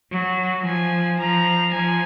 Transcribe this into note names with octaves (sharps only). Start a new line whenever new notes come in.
F#3
F3 G#5
F3 A#5
F3 G#5